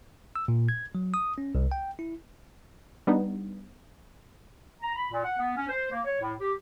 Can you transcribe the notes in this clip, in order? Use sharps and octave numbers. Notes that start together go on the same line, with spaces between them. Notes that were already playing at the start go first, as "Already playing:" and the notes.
E6
A#2
G#6
F#3
D#6
C#4
C2
G5
E4
G3 B3 D4 D#4
A#5
B5
A#2
F#5
B3
C#4
C5
A#3
C#5
A2
G4